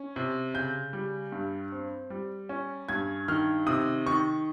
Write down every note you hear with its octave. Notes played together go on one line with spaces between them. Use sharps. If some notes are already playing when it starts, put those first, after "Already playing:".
Already playing: C#4
C3
C#3 G6
G3
G2
C4
G3
C#4
G2 G#6
D#3 F6
C3 D#6
D#3 C#6